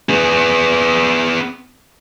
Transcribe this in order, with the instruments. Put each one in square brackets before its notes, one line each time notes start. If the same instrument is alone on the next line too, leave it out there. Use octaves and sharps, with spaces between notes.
[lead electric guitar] B3 G#4